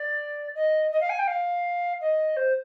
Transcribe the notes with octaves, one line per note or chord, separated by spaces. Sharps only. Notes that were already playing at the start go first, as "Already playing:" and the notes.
Already playing: D5
D#5
D#5
F5
G#5
G5
F5
D#5
C5